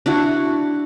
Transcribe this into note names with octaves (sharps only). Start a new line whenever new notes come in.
D4 E4 F#4